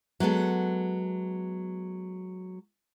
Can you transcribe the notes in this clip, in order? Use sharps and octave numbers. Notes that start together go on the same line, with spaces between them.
F#3 G#3 B3 A4